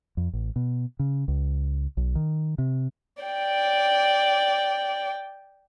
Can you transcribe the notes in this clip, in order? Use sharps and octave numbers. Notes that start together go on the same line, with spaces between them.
F2
A1
B2
C#3
C#2
B1
D#3
C3
D5 G5